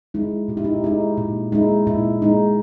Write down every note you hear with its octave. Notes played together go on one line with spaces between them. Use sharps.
G#3 D#4 E4
A#2 G4
E4
D#4 G4
G#3 D#4 E4
A#2
G#3 D#4 E4
A#2 E4
G#3 D#4